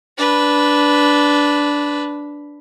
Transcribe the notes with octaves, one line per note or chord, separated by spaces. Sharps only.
D4 B4